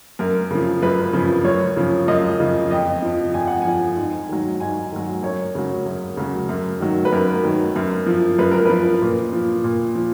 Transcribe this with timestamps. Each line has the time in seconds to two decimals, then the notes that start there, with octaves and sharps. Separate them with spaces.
0.19 F#2 A#4
0.51 C#3 F3
0.82 F#2 B4
1.13 C#3 F3
1.45 F#2 C#5
1.77 C#3 F3
2.08 F#2 D#5
2.40 C#3 F3
2.71 F2 D#5
3.02 F3
3.34 F2 G#5
3.47 F#5
3.62 F3 G#5
3.97 G#2
4.29 D#3 F#3
4.60 G#2 G#5
4.92 D#3 F#3
5.23 F#2 C#5
5.55 C#3 F#3
5.86 F#2
6.17 C#3 F#3
6.49 F#2
6.80 D#3 F#3
7.05 B4
7.12 F#2 A#4
7.44 D#3 F#3
7.76 F#2
8.06 F3
8.38 F#2 B4
8.52 A#4
8.66 F3 B4
9.02 A#2
9.33 F3
9.64 A#2
9.95 F3